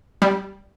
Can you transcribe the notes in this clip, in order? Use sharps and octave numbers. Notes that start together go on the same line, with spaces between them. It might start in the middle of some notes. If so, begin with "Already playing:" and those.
G3